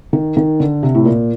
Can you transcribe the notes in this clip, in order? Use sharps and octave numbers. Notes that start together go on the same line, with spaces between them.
D#3
D#3
D3
C3
A2
A#2